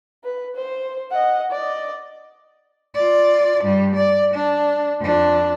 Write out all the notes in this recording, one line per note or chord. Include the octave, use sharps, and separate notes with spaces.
B4
C5
D#5 F#5
D5 D#5
F4 D5
G2 G3
D5
D4
F2 D4